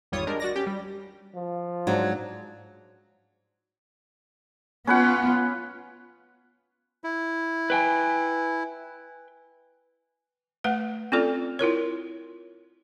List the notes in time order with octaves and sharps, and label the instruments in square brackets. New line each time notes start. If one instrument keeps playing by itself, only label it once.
[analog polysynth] G#1 E2 G3 F4 C#5 D#6
G3 G#3 D4 A#4
F#4 D5 A#6
C#4 G4
G3
[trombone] F3
[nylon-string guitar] G#2 F#3 D4
[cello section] B3 F4 [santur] C#4 B4 F#5
[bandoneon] E4
[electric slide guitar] B4 G5 G#5
[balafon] A3 B4 F#5
C4 C#4 F4 A4 D5
E4 F4 A#4 C#5